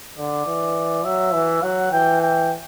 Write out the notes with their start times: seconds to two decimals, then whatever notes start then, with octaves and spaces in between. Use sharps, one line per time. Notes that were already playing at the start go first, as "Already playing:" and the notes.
0.18 D3 D5
0.47 E3
1.04 F#3 E5
1.34 E3
1.63 F#3 F#5
1.92 E3 G5
2.22 G5